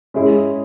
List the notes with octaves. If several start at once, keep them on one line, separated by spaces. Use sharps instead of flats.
G#3 C#4 E4 G#4